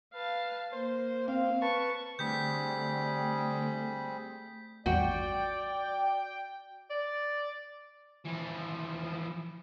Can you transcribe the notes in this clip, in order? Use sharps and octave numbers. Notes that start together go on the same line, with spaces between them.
B4 F5 A5
A#3 C5
C4 F5
B4 A5 C#6
D3 G3 A3 C4 G#4 G6 B6
A1 E2 G2 F#4 D5 G5
D5
E3 F3